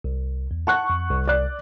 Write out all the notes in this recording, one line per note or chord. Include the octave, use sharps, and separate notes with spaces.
C2
E2
F#5 A5 C#6 F#6
F2
C2
D5 F#6